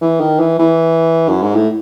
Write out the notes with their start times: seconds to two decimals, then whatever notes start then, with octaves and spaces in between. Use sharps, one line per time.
0.01 E3
0.20 D#3
0.40 E3
0.59 E3
1.29 F#2
1.42 G#2
1.55 A2